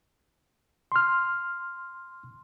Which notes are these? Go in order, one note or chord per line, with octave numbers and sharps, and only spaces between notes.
C6 F6